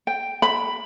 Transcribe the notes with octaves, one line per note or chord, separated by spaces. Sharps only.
G5
B5